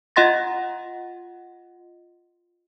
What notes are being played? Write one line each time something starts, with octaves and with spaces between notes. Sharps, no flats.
F4 D#5 F#5 C6 A6 A#6